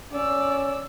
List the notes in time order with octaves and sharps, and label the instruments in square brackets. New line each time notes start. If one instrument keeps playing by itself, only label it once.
[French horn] C#4 [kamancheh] D5 E6